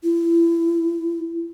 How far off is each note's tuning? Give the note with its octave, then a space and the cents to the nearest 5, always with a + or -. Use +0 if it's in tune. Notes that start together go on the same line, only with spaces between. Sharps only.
E4 +30